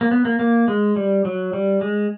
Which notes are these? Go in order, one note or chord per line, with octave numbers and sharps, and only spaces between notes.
A#3
B3
A#3
A#3
G#3
G3
F#3
G3
G#3